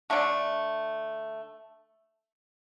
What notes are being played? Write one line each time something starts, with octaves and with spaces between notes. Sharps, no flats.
D3 A3 D4